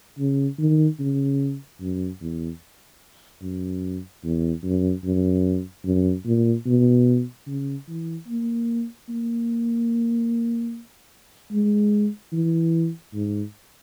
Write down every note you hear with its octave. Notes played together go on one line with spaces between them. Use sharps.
C#3
D#3
C#3
F#2
E2
F#2
E2
F#2
F#2
F#2
A#2
B2
C#3
E3
A#3
A#3
G#3
E3
G#2